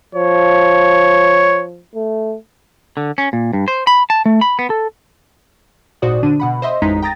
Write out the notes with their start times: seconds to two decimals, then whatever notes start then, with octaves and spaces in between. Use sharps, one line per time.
0.15 F3 C#5
1.95 A3
2.97 D3
3.18 C#4
3.33 A#2
3.53 G2
3.68 C5
3.87 B5
4.10 A5
4.26 A3
4.41 B5
4.59 B3
4.70 A4
6.02 G#1 A#2 F#4 C5 D5 D#6
6.23 D3 D4 D#7
6.40 B2 F#5 B5
6.62 C5 D#5 E5 C6
6.82 A1 F2 G#3 D#4 A#5 B6
7.02 G5 A#5 D#6 A6 A#6